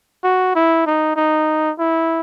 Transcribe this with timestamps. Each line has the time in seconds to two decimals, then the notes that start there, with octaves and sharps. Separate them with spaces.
0.24 F#4
0.56 E4
0.86 D#4
1.16 D#4
1.79 E4